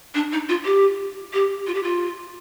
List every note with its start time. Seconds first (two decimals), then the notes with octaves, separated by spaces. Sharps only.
0.15 D4
0.32 D#4
0.49 F4
0.65 G4
1.34 G4
1.67 F4
1.75 G4
1.83 F4